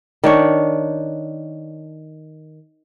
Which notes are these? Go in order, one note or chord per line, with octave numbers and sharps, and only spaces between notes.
D#3 D4 C#5